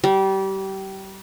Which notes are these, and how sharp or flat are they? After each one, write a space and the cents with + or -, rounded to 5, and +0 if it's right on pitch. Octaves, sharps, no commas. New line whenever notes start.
G3 -25